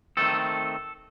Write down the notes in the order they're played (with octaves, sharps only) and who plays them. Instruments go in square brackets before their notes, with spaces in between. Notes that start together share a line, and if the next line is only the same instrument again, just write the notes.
[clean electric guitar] D#3 A3 C4 A4